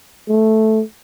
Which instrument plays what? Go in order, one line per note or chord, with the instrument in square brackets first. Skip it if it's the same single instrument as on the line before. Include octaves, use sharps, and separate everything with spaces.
[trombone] A3